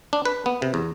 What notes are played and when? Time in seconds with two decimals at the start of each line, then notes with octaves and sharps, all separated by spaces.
0.13 D4
0.25 B4
0.46 B3
0.62 C3
0.74 E2